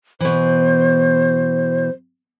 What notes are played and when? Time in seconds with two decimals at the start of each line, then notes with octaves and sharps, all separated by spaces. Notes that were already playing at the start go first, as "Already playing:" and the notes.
0.20 B2 E3 C5